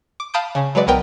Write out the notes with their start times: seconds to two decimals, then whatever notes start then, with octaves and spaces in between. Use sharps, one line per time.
0.20 D6
0.34 F5 A5 B5 D#6 G6 D7
0.55 C#3 C#4
0.75 F#3 G#3 B4 D5
0.87 B1 F#3 B3 A#4 G5